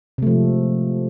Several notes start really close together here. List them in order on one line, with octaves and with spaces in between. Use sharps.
C3 A3 F3 G#3